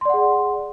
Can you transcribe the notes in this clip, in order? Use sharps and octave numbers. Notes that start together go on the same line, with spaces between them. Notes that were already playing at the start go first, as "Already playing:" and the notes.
G#4 D5 F#5 C6